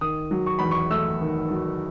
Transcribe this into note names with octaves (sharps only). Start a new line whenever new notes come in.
D#3 D#6
F#3
C#6
E2 B5
C#6
A3 E6
D#3
F#3